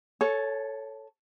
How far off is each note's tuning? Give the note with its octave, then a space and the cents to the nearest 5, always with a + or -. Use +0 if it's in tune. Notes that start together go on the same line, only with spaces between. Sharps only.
A4 +0 C#5 +0 A5 -45